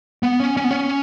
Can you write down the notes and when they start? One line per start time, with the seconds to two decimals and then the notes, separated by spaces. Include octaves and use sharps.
0.23 B3
0.40 C#4
0.57 C#4
0.64 B3
0.71 C#4